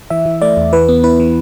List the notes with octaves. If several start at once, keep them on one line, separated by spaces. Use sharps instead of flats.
E3 E5
E3
A3 D5
E2
E3 B4
B3
E4 B4
E3